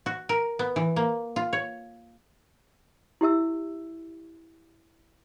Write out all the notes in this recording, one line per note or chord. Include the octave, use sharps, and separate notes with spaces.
F#4
A#4
B3
E3
A#3
F4
C#5
E4 G4 E5 E6